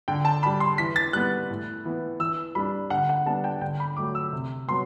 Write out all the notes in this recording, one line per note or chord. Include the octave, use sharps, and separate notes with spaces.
D3 G5
A5
G3 D4 B5
C6
E3 B6
A6
G3 B3 F#6
A2
E3 B3
E3 E6
G3 D4 B5
D3 F#5
F#5
G3 B3 D4 A5
G5
D3 G5
B5
F#3 A3 D6
E6
C3
F#3 B3 C6